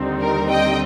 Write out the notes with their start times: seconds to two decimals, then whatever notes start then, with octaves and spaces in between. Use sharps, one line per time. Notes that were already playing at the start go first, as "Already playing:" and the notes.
Already playing: D#2 D3 G3 C4 D#4
0.20 A#4
0.49 D#5 G5